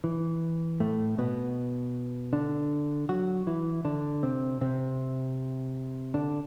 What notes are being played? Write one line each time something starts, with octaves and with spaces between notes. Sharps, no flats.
E3
A2 A3
B2 B3
D3 D4
F#3 F#4
E3 E4
D3 D4
C3 C4
C3 C4
D3 D4